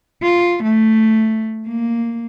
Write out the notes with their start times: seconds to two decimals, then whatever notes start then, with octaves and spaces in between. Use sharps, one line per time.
0.23 F4
0.63 A3
1.68 A#3